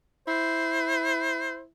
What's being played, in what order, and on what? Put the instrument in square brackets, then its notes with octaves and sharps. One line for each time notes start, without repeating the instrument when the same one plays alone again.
[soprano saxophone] E4 [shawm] C5